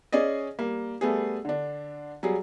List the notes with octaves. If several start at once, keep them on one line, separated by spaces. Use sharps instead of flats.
C#4 G#4 D5 D#5
G3 A#3
G3 A3 B3 G#4
D3 D4
F#3 G3 G#4